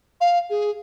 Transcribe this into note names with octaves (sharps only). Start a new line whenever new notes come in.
F5
G#4